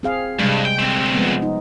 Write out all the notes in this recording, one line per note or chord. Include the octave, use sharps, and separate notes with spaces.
C4 G#4 F5
G2 C3 G3 G#3
G5
D2 C4
F3 G#3 B3
D#4